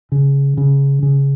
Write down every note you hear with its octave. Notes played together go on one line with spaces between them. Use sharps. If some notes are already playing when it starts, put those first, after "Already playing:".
C#3
C#3
C#3